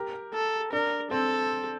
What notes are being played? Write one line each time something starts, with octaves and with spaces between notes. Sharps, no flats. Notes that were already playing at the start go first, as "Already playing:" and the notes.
Already playing: G4 A#4
A4
D4 A#4
C4 A4